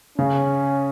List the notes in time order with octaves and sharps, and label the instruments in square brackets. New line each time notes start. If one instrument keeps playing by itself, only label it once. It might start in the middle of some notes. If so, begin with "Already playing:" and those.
[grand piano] C#3 [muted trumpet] C#4